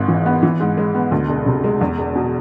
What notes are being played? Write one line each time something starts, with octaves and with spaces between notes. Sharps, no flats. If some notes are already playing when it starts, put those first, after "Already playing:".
Already playing: G#1 G#2
E3
B3
E3
G#2
G#3
B3
D2
E1
C3
G#3
E2
E1
B2